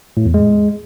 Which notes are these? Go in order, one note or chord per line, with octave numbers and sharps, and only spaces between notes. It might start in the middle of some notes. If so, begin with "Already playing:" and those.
A2
E2
G#3